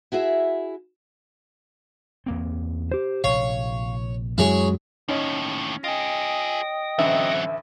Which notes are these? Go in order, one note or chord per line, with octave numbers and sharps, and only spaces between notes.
E4 F#4 G#4 E5
E2 A#3 C4
G4 C5
A#1 C3 C#5 F5
F#2 F#3 G#3 E4 G#4 C#5
D#2 A2 C#4 D#4
F4 G#4 D#5 G5 D#6
A1 D2 F#3 C4 E5